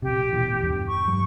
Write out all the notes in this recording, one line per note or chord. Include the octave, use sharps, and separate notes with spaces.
A#1 C3 G4
A1 B2 E3
E2 G2
C#6
G2 F#3 G3